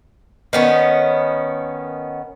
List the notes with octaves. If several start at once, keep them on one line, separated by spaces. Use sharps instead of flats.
D#3 B3 C#4